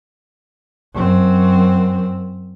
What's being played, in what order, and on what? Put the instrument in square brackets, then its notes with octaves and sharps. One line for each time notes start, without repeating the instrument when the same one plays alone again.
[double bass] F#2 C4